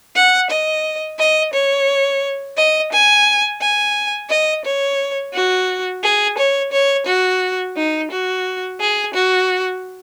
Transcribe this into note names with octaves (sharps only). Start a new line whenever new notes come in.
F#5
D#5
D#5
C#5
D#5
G#5
G#5
D#5
C#5
F#4
G#4
C#5
C#5
F#4
D#4
F#4
G#4
F#4